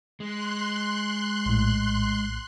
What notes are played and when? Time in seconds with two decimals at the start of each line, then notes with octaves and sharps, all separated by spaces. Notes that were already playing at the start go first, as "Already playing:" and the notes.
0.20 G#3 C6 F#6
1.46 A#1 A2